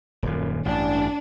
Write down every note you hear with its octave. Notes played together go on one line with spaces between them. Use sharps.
D#1 F#2 A#2
A1 G2 D4